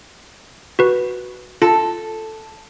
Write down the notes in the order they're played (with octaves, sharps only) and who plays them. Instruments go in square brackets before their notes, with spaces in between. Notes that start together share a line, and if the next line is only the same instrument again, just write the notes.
[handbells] F#4 B4
[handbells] F4 [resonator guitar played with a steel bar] A4